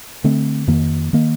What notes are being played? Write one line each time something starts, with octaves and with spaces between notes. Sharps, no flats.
D3 A3 C4
F2 D#3 A#3
D#3 A#3